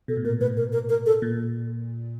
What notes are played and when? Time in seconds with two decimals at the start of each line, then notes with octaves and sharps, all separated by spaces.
0.08 B2 A4
0.17 A2
0.25 A#2 A#4
0.41 A2 B4
0.57 A#4
0.72 A#4
0.89 A#4
1.06 A4
1.22 A#2